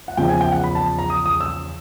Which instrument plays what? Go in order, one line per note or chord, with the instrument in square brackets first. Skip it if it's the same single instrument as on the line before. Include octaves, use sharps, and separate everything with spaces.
[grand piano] F#5
E2 C#3 F3 G5
G#5
G5
F#5
B5
A5
A#5
D#6
D#6
E6